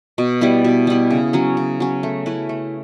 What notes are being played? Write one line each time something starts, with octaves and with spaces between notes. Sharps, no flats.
B2
G3 B3 E4
B2
G3 B3 E4
C#3
F#3 C#4
C#3
F#3 C#4
A3
C#4 E4 B4
A3